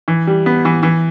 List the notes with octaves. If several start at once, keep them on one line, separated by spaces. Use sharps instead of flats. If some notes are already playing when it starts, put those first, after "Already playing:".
E3
G3
B3
E3
E3